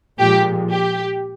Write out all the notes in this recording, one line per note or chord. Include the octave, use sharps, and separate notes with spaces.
A#2 F3 G#3 G4
G4